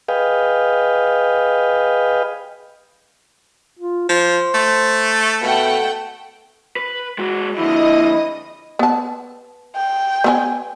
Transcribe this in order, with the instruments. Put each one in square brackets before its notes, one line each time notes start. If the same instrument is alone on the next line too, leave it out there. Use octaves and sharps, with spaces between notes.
[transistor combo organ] G#4 B4 D#5 F5 G5
[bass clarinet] F4
[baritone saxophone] F3 [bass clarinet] C5
[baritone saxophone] A3
[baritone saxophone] B2 [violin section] A3 F#5 G5
[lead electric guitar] B4
G#3 F#4
[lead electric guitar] F2 D3 [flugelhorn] E4 [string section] D#5 D#6
[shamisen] B3 A5
[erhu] G5
[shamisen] B3 C4 G#5